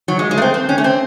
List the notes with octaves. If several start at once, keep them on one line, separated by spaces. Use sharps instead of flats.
F#3
G#3
G#3
A3
C4
C4
C#4
A3
C4